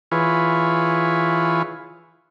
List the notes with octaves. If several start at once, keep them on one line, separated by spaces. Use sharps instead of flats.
E3 F4 G#4 B4 C#5